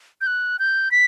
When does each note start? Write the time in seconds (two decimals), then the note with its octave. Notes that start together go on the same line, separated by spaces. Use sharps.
0.21 G6
0.27 F#6
0.59 G6
0.91 B6